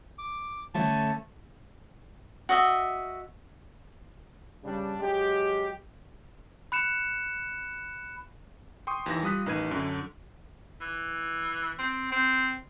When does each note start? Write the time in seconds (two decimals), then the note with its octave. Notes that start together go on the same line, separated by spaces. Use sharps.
0.18 D6
0.74 D3 A3 C#4 A5
2.49 F#4 D#5 E5
4.64 G2 C#3 G3 D4
5.00 F#3 G#3 G4
6.72 B5 F#6 C#7 E7
8.87 G5 C6 C#6 D#6
9.06 D#2 E3 A#6
9.23 G3 F4 D#6 F#6 B6
9.46 A1 D#3 B4 G#6 D#7
9.71 F#2 D3
10.81 E3
11.79 C4
12.12 C4